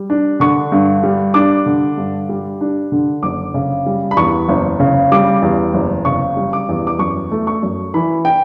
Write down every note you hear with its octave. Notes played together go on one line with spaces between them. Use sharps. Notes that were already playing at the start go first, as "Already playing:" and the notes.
Already playing: G3
D4
D3 C#6
G2
G3
D4 D6
D3
G2
G3
D4
D3
F#1 D6
C#3
G3
B5
E2 C#6
F#1
C#3
G3 D6
E2
F#1
C#3 C#6
G3
D6
E2
D6
F#2 C#6
A3
C#6
F#2
E3 B5
G5